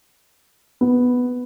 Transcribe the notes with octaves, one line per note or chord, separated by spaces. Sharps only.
B3